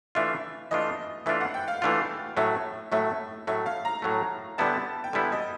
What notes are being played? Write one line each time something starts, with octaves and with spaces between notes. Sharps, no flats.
E3 A3 D4 F4 E5
E3 A3 D4 F4 D#5
E3 A3 D4 F4 E5
F#5
G5
F5
E3 A3 D4 F4 F5
A2 F#3 A3 E5
A2 F#3 A3 E5
A2 F#3 A3 E5
F5
A#5
A2 F#3 A3
D3 G3 B3 E4 A5
G5
D3 G3 B3 E4 G#5
D#5